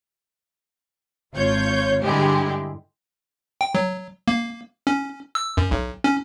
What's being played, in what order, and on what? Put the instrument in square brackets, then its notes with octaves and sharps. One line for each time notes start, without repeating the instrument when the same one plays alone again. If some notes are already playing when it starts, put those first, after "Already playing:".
[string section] G#1 F4 C#5 G6
G2 D3 G#3 E4 G4
[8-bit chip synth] G5
F#3
A#3
C#4
E6
F#2
B1
C#4